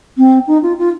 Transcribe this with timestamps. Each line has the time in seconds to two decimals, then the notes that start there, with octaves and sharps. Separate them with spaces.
0.17 C4
0.47 D#4
0.62 F4
0.78 F4